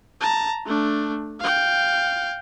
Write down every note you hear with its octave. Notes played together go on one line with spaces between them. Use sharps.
A5 A#5
A3 D4
F5 G5